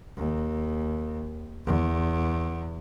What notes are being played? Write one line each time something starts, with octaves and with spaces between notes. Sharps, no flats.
D#2
E2